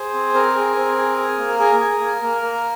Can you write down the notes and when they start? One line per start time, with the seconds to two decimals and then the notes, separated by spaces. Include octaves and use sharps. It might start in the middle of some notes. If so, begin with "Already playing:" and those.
Already playing: G#4 C5
0.13 C4
0.34 C4 A#4
0.55 G#4
0.76 C4
0.97 G#4
1.18 G#4
1.39 A#3
1.59 G#4 A#4
1.80 G#4
2.01 A#3
2.22 A#3
2.42 A#3